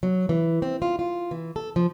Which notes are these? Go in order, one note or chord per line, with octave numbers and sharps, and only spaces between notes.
F#3
E3
C4
F4
F4
E3
A4
F3